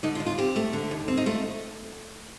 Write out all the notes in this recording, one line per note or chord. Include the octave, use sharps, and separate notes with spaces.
D3 D#4
F4
D#2
F4
C4 G4
A3
D3
D#2
C4
D#4
A3 F4